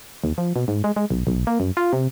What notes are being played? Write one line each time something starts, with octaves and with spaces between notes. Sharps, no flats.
D#2
F3
B2
G#2
G#3
G#3
B1
B1
A#3
F#2
F4
C3